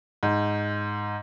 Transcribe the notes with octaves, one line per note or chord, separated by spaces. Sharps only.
G#2